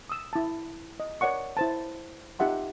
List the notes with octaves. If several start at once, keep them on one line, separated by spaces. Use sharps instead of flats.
D#6 E6
E4 A5
D#5
A#4 C#5 D5 F#5 C#6
E4 C5 A5
D#4 F4 G4 E5 F#5 C6